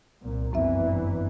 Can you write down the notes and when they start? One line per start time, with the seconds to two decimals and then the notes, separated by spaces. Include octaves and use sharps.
0.22 C2 A#2
0.53 G1 F#2 E3 C4 E5